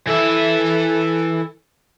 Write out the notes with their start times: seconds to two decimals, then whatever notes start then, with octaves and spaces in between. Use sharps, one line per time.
0.07 E3 A4 E5